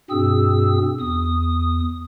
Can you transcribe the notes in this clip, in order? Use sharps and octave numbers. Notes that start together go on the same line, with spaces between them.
G2 B2 C4 G#4 E6
E2 D#6